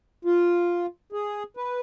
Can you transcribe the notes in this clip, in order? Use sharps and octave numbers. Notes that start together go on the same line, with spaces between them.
F4
G#4
B4